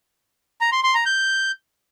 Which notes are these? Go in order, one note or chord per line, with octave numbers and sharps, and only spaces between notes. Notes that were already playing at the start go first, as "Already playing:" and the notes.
A#5
C6
C6
A#5
G6